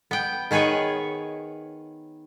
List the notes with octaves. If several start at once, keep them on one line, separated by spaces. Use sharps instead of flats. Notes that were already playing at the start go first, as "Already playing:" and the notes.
B3 G5
D#3 B3 G#4 B4 C#5